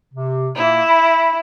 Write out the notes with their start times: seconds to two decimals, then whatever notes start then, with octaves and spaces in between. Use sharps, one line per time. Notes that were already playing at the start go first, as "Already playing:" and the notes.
0.14 C3
0.56 A#2 A#3 E4
0.89 B5